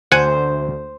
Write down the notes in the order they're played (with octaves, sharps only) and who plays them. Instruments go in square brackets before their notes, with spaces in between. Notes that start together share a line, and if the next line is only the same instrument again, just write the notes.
[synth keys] D2 [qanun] C5 [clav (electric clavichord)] F#5 G#5